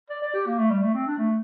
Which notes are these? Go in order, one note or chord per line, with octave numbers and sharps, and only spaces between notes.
D5
D5
G4
A#3
A3
G3
A3
C4
D4
A3